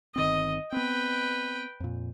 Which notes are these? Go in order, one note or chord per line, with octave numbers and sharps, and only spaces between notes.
G1 D#3 C4 D#5
B3 C4 B4 G5
F2 A#2